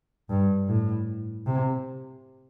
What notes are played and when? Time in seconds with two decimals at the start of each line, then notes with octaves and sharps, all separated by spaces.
0.30 G2
0.68 A2
1.46 C3